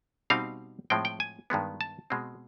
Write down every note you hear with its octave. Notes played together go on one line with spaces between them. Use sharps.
B2 G3 C4 D#4 F5
A2 F3 G#3 C4 G5
G5
G#5
G2 D#3 G#3 B3
A5
B2 G#3 C4